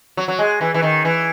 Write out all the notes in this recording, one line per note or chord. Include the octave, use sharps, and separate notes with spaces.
F#3
F#3
G#3
E3
E3
D#3
E3